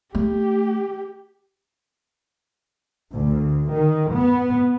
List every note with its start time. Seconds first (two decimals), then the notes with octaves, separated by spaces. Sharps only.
0.15 A3 G4
3.11 D2
3.73 D#3
4.12 B3